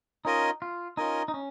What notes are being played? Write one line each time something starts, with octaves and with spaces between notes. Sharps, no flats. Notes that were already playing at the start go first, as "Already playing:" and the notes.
C#4 D#4 F4 A#4 D#5 G#5
F4
C#4 D#4 F4 A#4 D#5 G#5
D#4
C#4